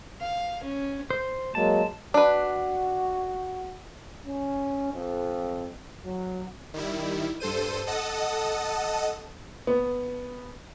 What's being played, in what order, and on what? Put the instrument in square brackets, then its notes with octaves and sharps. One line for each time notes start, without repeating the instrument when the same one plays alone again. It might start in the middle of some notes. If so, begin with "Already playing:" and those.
[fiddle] F5
C#4
[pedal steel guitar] C5
[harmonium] F#3 G#3 A#3 [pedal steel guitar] A5
[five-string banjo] D4 B4 [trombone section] F#4
[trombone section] C#4
F2
F#3
[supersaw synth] D#3 G3 E4
G2 A4 C5 D#7
A4 D#5 F#5 A5 D#6
[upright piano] B3